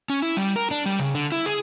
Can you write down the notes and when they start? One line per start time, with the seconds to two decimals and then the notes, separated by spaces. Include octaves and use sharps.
0.10 C#4
0.22 E4
0.37 G3
0.56 A#4
0.71 D4
0.86 G3
0.99 C#3
1.15 D3
1.32 E4
1.46 G#4